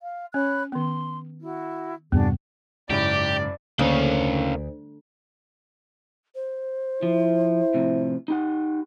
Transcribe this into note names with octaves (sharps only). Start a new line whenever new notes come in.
F5
C#4 C#5 B5 F#6
D#3 B3 C6
E4 F#4
E2 G2 C3 B3 D4 F#4 G#4
F#1 G#2 C#3 E4 G4 D5 D7
D2 C#3 A#3 C#4 C#5 F5
C5
F3 E4
A2 C3 F3
D#4 G4 F#5